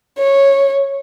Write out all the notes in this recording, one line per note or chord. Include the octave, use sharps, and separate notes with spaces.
C#5